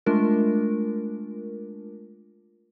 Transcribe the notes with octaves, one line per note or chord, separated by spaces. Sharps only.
G#3 A3 D4 F4 A#4